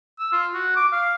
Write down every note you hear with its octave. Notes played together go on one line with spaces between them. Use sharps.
E6
F4
F#4
D6
F5